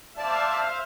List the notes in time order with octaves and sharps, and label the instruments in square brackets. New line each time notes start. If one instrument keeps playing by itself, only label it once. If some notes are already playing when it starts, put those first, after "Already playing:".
[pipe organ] C5 F5 [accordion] D5 A5 [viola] E5